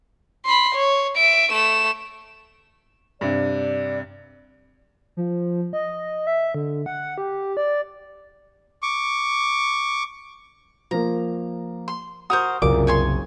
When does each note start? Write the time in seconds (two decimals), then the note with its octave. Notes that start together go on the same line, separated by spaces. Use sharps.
0.46 B5 C6
0.75 C#5
1.16 E5 D7
1.52 A3 E7
3.21 G2 C3 D5
5.17 F3
5.73 D#5
6.27 E5
6.55 D3
6.86 F#5
7.18 G4
7.57 D5
8.82 C#6 D6
10.91 F3 A#3 A#5
11.88 C6
12.30 F#4 A#4 C5 D#6
12.62 F#1 C2 A#2 D6
12.87 C#5 G#5 C6